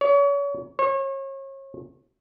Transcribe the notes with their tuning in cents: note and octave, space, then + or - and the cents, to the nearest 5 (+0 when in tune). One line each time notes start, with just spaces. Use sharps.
C#5 +35
C#5 -35